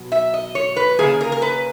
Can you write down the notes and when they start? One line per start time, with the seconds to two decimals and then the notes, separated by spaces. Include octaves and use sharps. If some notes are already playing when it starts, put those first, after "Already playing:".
Already playing: B2 F#3
0.12 E5
0.34 D#5
0.55 C#5
0.76 B4
0.99 C#3 E3 A#3 G#4
1.21 A#4
1.32 A#4
1.42 B4